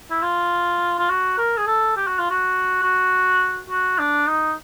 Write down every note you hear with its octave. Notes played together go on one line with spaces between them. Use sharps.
E4
F4
F4
F#4
A#4
G#4
A4
G4
F#4
F4
F#4
F#4
F#4
D4
D#4